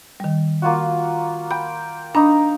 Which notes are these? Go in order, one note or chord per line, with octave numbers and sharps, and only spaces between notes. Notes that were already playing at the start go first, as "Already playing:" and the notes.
D#3 G3
A#3 F4 F#4
G5 B5
D4 D#4 A#5 B5 D6